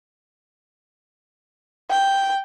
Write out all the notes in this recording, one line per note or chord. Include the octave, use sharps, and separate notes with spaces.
G5